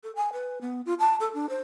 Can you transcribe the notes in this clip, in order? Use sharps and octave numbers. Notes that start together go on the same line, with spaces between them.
A4
G#5
B4
B3
F4
A5
A4
D4
C5